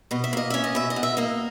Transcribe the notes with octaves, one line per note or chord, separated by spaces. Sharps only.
B2 D#5
E5
A#3 D#5
C#4 E5
D#5
B2 E5
D#5
B2
E5
A#3 D#5